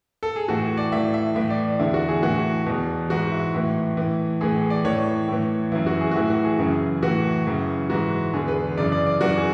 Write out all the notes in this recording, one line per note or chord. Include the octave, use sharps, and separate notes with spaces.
A4
G#4
A2 E3 F#4
D5
A2 E3 E5
E5
A2 E3 E5
D5
E2 D3 E4
F#4
G#4
A2 E3 F#4
E2 B2
G#2 E3 F#4
E4
A2 E3
A2 E3
A2 E3 G#4
D5
A2 E3 C#5
A2 E3
F#2 E3 E4
F#4
G#4
F#4
A2 E3 E4
F#4
G#4
F#2 C#3 E3
A2 E3 F#4
F#2 C#3 E3
G#2 E3 F#4
E2 D3 G#4
B4
F#2 C#3 E3 D5
D5
D5
F#2 E3 F#4
G#4